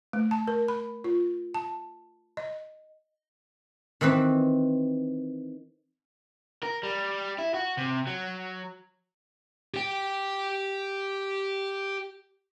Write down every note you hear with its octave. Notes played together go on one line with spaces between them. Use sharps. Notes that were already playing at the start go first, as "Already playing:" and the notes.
A3
A5
A#4
B5
F4
A5
D#5
D#3 E3 C4 B4
A#4
G3
E4
F#4
C3
F#3
G4 G5